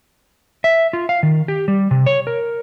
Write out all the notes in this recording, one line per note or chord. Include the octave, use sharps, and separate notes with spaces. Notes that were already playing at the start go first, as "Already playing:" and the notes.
E5
F4
F5
D#3
G4
G3
C3
C#5
A#4